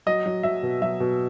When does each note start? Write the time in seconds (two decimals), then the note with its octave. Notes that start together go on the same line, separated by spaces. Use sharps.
0.06 F#3 D#5
0.26 F#3
0.43 F#3 E5
0.63 B2
0.82 F#3 E5
1.00 B2